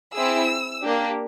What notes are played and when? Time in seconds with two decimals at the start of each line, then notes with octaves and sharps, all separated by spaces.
0.15 C4 E4 G#4 E6
0.81 A#3 D4 G4